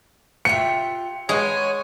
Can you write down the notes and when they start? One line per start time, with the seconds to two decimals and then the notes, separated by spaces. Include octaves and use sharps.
0.45 F4 G4 E5 C#7
1.29 G#3 D#4 B4 C#5 F#5 G#5